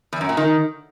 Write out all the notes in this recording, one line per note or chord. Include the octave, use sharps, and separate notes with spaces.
E2
F#2
A#2
D#3